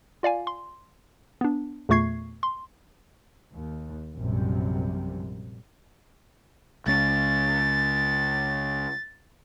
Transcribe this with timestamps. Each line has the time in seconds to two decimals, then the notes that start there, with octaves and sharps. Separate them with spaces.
0.23 F4 D5 F5 G#5
0.47 C6
1.41 B3 D4
1.89 E2 A#2 A3 C#6 G#6 C7
2.43 C6
3.53 D#2
4.15 A#1 F#2 C3 G3
6.87 C#2 C#4 A6